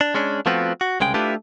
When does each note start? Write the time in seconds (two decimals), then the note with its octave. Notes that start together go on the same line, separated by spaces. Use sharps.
0.01 D4
0.14 G#3 C#4 D4
0.46 F3 A3 B3 C4 F4 F#4
0.81 F#4
1.00 C2 C#3 G#3 G5
1.14 A3 D4 E4 F4 G4 B4